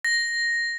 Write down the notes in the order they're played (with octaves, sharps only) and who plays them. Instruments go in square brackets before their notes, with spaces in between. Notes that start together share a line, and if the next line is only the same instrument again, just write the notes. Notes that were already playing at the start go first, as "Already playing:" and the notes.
[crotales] A#6